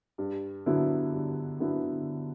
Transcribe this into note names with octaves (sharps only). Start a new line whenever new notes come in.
G2
D3 F#3 B3 E4
G2
D3 F#3 B3 E4